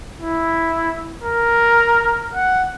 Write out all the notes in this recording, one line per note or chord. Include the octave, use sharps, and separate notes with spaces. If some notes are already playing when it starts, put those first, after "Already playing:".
E4
A#4
F#5